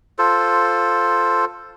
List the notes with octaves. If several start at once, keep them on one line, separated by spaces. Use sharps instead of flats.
F4 A4 C5